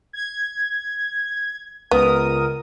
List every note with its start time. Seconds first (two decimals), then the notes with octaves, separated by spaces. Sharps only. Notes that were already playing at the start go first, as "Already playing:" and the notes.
0.13 G#6
1.91 C#2 B3 A#4 D#6